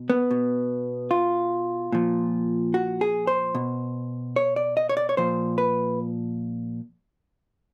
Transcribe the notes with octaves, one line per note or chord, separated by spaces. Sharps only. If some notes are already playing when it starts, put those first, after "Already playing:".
Already playing: B2
B3
B2
F4
A#2 F3
F#4
G#4
C5
B2
C#5
D5
D#5
C#5
D5
C#5
A#2 F3 C5
B4